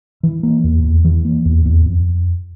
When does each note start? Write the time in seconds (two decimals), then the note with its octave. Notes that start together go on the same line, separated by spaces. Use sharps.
0.23 E3
0.43 A#3
0.64 E2
0.84 E2
1.05 E3
1.25 A#3
1.45 E2
1.65 E2
1.86 F2